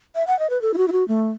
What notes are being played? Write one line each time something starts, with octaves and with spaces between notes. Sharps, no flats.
E5
F#5
D#5
B4
A4
E4
F#4
E4
F#4
A3